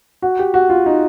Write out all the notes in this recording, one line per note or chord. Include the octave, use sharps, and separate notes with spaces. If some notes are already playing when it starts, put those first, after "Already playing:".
F#4
G4
F#4
F4
D#4